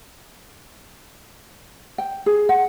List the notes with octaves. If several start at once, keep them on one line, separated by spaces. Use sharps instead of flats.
G5
G#4
F#5